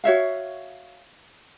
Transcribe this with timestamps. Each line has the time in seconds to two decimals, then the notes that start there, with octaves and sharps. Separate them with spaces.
0.04 F#4 C#5 E5 F5